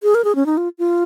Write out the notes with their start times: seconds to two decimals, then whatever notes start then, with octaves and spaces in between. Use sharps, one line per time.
0.03 G#4
0.15 A#4
0.24 G#4
0.35 C#4
0.46 D#4
0.57 F4
0.79 F4